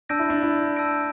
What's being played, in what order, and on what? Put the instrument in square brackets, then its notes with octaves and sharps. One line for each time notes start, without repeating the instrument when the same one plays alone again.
[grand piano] D4 [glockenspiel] A5 E6 G6 A#6 D7
[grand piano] E4
D4
E4
[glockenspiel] A5 E6 G6 A#6 D7